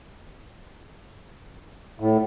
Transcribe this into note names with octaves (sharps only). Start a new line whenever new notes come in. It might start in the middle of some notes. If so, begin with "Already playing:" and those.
A2